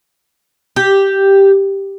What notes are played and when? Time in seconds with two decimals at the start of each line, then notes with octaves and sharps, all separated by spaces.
0.76 G4